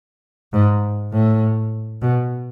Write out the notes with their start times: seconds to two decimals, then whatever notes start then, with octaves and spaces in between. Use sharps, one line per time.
0.53 G#2
1.12 A2
2.02 B2